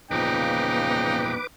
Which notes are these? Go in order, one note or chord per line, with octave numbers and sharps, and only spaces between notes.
E2 A#2 C#3 F3 D#4 B4 G5 D6